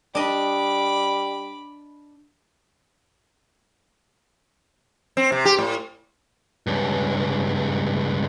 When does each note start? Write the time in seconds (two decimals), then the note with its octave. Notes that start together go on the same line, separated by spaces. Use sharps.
0.15 G3 D4 D#5 B5 D6
5.17 C4
5.32 C3
5.45 G4
5.59 A2
6.67 C#2 G2